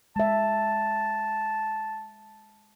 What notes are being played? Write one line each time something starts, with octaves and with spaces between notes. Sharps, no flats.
G#3 E5 A5